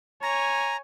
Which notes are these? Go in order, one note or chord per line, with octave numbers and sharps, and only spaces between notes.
C#5 G#5 A#5